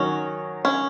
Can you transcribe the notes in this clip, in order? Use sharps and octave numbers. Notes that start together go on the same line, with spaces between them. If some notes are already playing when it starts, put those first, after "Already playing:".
Already playing: D#3 F#3 C#4 D#4 F#4
C#4